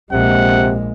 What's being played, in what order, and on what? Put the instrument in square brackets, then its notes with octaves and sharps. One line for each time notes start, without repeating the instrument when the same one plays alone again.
[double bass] A#1 G#3 [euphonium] C3 [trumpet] F#5